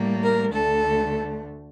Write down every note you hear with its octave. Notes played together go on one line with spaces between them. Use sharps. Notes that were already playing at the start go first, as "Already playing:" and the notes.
Already playing: A2 G3 A#3
A#4
D2 D3 A3 A4